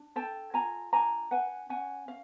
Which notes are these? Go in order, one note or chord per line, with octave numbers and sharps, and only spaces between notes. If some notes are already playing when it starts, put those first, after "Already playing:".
Already playing: D4
A4 G5 A5
F4 G#5 A#5
D4 G#5 A#5
B4 F#5 G#5
C#4 F#5 G#5
C#4 F5